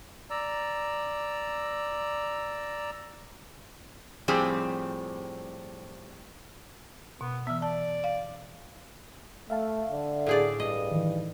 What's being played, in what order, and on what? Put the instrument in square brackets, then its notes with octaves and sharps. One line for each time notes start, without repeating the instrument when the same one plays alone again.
[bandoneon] D5 A#5 E6
[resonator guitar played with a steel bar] A2 F3 G3 C4 G4 G#4
[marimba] B2 [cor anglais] B3
[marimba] E3 B3 [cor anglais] E5
[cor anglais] D5 [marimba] A5
[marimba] F5
[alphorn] A3 [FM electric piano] E5 F5 A5
[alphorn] D3
[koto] A2 G#4 D5
[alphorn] G2 [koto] D#5
[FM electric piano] D#3 E3